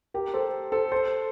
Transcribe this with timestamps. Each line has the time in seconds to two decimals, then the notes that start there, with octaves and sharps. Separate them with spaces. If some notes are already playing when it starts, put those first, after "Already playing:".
0.14 G4 A#4
0.34 A4 C5
0.72 A4 C5
0.92 A4 C5